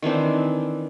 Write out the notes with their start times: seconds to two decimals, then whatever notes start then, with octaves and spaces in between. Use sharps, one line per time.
0.02 D#3 E3 C4 D4